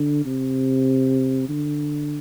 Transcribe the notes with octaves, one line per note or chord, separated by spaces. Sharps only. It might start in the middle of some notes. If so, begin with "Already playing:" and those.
Already playing: D3
C3
D3